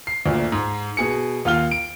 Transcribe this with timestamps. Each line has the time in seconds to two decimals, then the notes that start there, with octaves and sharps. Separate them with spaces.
0.07 C7
0.26 D2 A#2
0.52 G#2
0.97 B2 G#4 C#7
1.45 D#2 F4 F5 F6 G7
1.71 D7